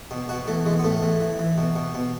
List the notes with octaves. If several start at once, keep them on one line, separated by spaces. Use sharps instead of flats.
B2
B2 F#4
E3 A3
E3 G#3
B3
A2 A3
E3
E3
E3
B2
B2
B2